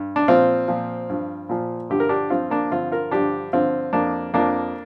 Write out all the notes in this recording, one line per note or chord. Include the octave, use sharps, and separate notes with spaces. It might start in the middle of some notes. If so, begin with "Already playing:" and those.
Already playing: G2
D4
A#2 F3 C4 F4
A#2 F3
G2 F3
A#2 F3
G2 D3 F3 G4
A#4
D4 G4
G2 F3 C4 F4
A#3 D4
G2 D3 F3 C4 F4
F4 A#4
G2 D3 F3 D4 G4
G2 D3 F3 C4 F4
F2 F3 A#3 D4
F2 F3 A#3 D4